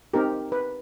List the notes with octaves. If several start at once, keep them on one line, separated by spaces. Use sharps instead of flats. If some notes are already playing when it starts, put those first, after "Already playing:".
C4 D#4 G4 A#4
B4